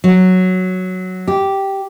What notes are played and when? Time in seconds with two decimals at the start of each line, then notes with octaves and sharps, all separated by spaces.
0.04 F#3
1.28 G4